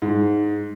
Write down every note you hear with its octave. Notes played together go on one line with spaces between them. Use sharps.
G#2